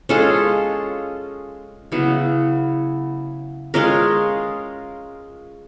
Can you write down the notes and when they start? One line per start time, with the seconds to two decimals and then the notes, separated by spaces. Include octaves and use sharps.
0.09 G#3 C#4 F4 A4
1.92 C#3 F#3 B3 E4
3.74 G#3 C#4 F4 A#4